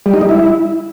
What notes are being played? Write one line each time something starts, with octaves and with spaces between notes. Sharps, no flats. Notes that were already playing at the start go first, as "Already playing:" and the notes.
G3
D#4
G3
E4